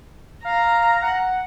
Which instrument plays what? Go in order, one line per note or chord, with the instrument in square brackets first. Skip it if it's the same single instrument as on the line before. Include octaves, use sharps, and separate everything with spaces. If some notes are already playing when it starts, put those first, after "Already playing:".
[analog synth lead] F5 [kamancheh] A#5
[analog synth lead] F#5